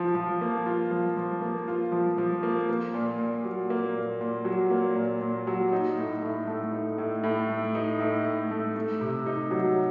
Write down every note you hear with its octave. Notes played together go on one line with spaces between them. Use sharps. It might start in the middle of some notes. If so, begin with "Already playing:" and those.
Already playing: F3 F4
F3
A#3
F4
F3
F3
A#3
F4
F3
F3
A#3
A#3
A#2
A#2
F#3
A#3
A#2
A#2
F#3
A#3
A#2
A#2
F#3
D#4
A2
A2
A3
D#4
A2
A2
A3
D#4
A2
A2
A3
A3
C3
D#4
F#3